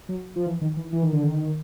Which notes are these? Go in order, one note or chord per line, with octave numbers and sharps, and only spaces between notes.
F#3
F3
E3
D#3
E3
E3
D#3
D3
D#3